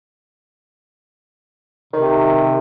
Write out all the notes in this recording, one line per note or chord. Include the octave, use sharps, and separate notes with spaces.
C3 D#3